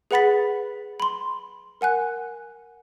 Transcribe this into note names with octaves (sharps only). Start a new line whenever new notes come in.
G#4 B4 F#5 B5 A6 B6
B5 C6
A#4 F#5 G#5 F#6